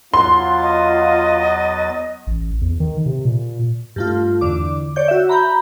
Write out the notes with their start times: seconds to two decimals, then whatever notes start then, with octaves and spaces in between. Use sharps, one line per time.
0.14 E2 F#3 F4 C6 A6
0.62 D#5
2.27 A1
2.61 E2
2.80 D#3
3.06 C3
3.25 A#2
3.96 G2 A3 F4
4.41 E2 D3 D6
4.96 C#5 D5 G6
5.08 F#4 E5
5.29 A#5 B5 G6